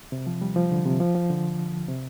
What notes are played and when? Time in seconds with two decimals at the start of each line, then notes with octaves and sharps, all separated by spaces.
0.12 C3
0.27 F3
0.42 G3
0.56 F3
0.71 D3
0.86 C3
1.00 F3
1.15 F3
1.30 D3
1.88 C3